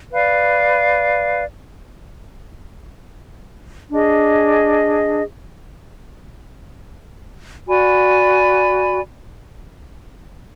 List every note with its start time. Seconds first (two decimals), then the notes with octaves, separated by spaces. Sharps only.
0.12 B4 D5 F5
3.90 D4 G#4 D#5
7.68 F#4 D5 G#5 B5